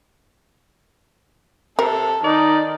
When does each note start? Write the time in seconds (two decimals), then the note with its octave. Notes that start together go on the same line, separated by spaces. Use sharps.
1.79 C3 A4 A#4
2.24 D#3 D#4 D5